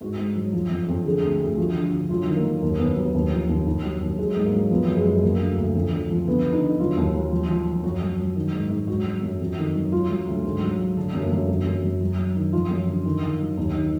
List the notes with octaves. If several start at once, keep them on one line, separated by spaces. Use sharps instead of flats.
G#2 F#4
G#2
F#3
F3
F2
F2
D3 G#4
D2
D2
F3 F#4
D3
F#4
D3
F#3 F4
D#3
A#3
F#3
D#2 A#3
D#2 B3
F#3 B3
D#2
F3
D#2
D#2
F#3
D#2
F#3 G#3
G#2
A#3
F#3
F3 B3
F#2
G#3
F#2
D2 A#3
D2
D2
F2
F2
F3
D3 B3
D3
D#4
D3
F#3 F4
D#2
F#3
F3
F3
F3
F#2 F#4
F#3
F#3
D#3
G#2
G#2
F#3 F#4
F#3
F#2
F2
D#3
F#3
F#3 F4
F#3
D2
G#2
F#3
F#3
D3 D4
F#2
A#3
F#2
F#2
F#2
F#2
F#3
F#3
D#3
F3 F4
F#2
D3
D#3
D#3
F#3
D#2 D#4
D#3